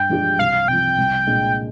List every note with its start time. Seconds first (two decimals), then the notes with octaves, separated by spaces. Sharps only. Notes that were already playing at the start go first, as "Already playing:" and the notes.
Already playing: G2 G5
0.09 F3 G#3 D4 G4
0.39 C2 F5
0.68 C3 F3 G5
0.98 C2
1.27 A#2 G#3 D4